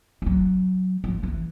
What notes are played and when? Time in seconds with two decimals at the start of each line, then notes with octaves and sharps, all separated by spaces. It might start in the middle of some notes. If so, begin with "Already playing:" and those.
0.22 F3
0.26 F#3
1.04 F3
1.23 E3